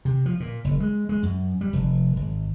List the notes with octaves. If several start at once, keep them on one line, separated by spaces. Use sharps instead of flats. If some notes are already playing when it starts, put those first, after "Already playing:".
C3
F3
A#2
F#1
G#3
G#3
F#2
G3
F1
G#1